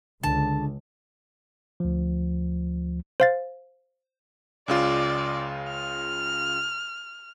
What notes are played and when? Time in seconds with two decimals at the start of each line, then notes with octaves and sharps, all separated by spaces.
0.23 C#2 D3 A5
1.80 D2 F3
3.20 C5 F5 A6
4.68 C#2 C#3 F4 D5
5.68 F6